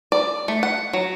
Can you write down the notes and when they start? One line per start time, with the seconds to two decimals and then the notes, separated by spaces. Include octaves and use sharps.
0.12 D5
0.48 A3
0.63 F#5
0.93 F#3